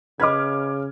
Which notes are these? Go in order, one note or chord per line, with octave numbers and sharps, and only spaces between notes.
C#3 B4 D#5 D6 F6 G#6